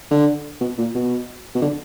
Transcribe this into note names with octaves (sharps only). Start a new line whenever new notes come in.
D3
B2
A#2
B2
B2
D3